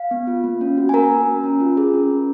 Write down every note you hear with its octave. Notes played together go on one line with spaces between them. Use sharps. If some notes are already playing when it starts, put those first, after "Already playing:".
Already playing: F5
B3
F4
A#3
C#4
F#4
G#5
A#3 A#4 A#5
A#3
C#4
C#4
F4
G#4
C#4
C#4